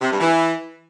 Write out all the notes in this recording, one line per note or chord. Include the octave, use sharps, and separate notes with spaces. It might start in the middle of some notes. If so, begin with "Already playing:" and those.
C3
G2
E3